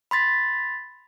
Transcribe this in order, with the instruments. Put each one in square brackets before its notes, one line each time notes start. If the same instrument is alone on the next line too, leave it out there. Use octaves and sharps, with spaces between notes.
[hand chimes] B5 C6 A6 B6